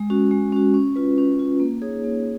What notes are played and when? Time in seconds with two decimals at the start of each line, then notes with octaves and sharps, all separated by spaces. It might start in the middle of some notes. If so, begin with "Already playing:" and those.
Already playing: G#3
0.10 C#4 F#4
0.31 G#3
0.52 C#4 F#4
0.74 C#4
0.96 F4 B4
1.18 C#4
1.39 F4 B4
1.60 A#3
1.82 D#4 G#4 C#5
2.04 A#3